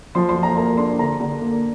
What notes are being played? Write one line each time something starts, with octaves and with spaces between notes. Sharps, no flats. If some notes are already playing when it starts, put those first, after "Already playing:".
F3 C6
C6
F3
A#5
A#3 A#5
D4 C6
D3 A#5
D3
A#3